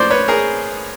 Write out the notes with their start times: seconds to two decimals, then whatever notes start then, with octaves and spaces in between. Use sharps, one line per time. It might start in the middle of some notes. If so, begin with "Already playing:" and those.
Already playing: A2 F3 A#3 C#4 C5 D5
0.10 B4 C#5
0.28 G#4 A#4